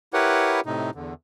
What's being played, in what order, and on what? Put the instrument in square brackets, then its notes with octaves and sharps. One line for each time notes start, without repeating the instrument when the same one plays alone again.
[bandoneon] E4 G4 A#4 B4 C#5 F#5
A2 C3 D#4
E2 D3